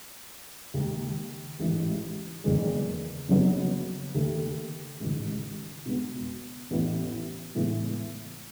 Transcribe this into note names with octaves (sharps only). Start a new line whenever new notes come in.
D#2 D#3 G#3
A1 G#2 E3
F#1 E2 D#3 G#3
F#1 F#2 C#3 F#3 B3
D#2 D#3 A3
A1 G#2 D#3
B2 G#3 B3
A1 A2 E3 B3 E4
A2 E3 G#3 B3 E4